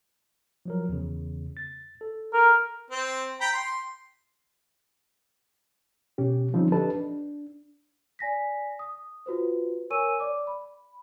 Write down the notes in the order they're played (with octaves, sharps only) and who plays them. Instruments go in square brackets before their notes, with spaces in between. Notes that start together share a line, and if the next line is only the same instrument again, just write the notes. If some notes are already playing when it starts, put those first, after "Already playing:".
[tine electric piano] F3 F#3 A#4
E2 C#3
A6
A4
[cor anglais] A#4
[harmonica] C4
G5 A#5 B5
C6
[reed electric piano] B2 C#4 G4
D3 F3 G3 C4 C#4 D#4
D4 G4 A4 B4 D#5 A5
D4
[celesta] D5 G#5 A#6 B6
D#6
F4 F#4 B4 C5
A#4 C#5 G#5 C#6 E6 D#7
D5 D6
B5